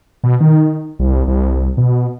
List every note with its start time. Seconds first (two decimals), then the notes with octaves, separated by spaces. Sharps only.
0.24 B2
0.40 D#3
0.99 C2
1.27 C2
1.77 B2